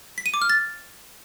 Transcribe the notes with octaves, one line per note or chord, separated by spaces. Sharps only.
B6
D#7
D6
F6
A6